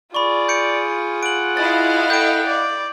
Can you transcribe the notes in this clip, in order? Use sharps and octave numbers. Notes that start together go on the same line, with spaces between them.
F4 G#4 D5 B5 C#6
G6 C#7 D7
F#5 D7 F#7
E4 D#5 F5 A6
A4 G5 G6 D7
D5